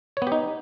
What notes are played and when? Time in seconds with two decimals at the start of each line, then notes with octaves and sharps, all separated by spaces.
0.17 C#5
0.22 B3
0.27 G4
0.32 D#4